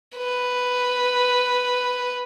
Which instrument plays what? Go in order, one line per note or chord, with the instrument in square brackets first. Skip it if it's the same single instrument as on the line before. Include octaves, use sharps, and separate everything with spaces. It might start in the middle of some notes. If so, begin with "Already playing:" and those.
[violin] B4